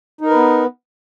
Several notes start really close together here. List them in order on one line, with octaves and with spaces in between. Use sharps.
D#4 A#4 B4 B3